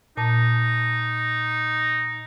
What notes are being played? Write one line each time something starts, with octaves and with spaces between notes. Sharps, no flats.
A#2 D#4 A5